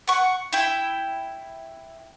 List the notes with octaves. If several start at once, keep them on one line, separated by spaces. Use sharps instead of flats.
F#5 C#6
E4 G5